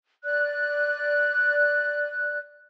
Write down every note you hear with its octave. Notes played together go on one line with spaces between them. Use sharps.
D5 F#6